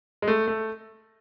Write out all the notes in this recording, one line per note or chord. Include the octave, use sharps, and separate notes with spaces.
G#3
A3
A3